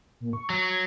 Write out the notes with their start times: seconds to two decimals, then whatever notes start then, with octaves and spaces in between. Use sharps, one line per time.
0.20 A#2
0.33 C#6
0.50 F#3
0.62 G#6